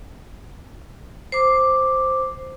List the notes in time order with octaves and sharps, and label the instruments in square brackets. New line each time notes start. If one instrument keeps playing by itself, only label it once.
[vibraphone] C5 D6